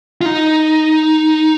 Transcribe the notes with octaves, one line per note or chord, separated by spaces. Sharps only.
F4
D#4